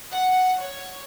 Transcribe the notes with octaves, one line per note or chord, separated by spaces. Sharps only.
F#5
C#5